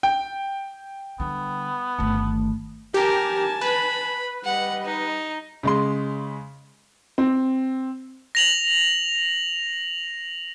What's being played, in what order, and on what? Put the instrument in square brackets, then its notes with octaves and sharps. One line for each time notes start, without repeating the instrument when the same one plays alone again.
[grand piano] G5
[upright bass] D3 G3 [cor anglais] B3
[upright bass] G1 D#3 [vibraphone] A3
[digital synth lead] G4 [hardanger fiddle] A#4 [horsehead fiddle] G#5 A5
[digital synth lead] B4 [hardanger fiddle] B5
[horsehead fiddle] G3 D#5 [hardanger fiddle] F#5
[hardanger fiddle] D#4
[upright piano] C#3 G#3 C6
C4
[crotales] A#6 F7 F#7